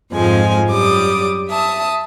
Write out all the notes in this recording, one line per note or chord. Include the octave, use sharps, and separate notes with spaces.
F2 G#2 F3 G#3 G#5
F#2 G3 D6 D#6
E5 A5 D#6